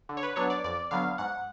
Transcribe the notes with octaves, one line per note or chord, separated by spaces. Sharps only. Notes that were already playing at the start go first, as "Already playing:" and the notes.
D3
C#5
B4
F#3 B3 D4 C#5
D5
F2 D5
D3 F#3 B3 F5
G#2 F#5